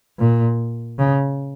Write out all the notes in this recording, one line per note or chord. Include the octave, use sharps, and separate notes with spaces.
A#2
C#3